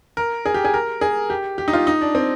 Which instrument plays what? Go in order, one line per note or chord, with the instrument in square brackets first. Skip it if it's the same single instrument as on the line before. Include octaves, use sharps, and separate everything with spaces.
[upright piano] A#4
G#4
G4
G#4
A#4
G#4
G4
G4
D#4
F4
D#4
D4
C4